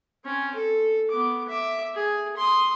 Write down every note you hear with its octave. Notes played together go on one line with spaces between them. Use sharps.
C4 C#4
A4
B3 D6
E5 D6
G#4
C6 D#6